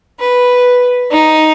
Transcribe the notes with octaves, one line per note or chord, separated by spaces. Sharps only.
B4
D#4